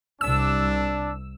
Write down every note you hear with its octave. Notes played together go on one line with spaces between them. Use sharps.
C2 D4 E6